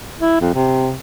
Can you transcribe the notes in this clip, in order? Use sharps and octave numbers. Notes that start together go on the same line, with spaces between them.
E4
F2
C3